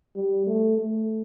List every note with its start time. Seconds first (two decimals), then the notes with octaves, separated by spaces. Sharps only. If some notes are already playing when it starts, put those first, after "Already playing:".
0.15 G3
0.47 A3
0.79 A3